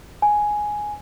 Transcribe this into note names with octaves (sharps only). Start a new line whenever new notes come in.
G#5